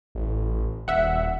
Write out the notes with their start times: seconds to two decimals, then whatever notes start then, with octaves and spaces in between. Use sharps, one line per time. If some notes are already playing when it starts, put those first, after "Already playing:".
0.15 A1
0.88 D#1 E5 F#5